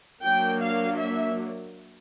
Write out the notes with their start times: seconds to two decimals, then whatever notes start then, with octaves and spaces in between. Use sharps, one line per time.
0.23 F#3 A#3 D4 G5
0.61 F5
0.98 E5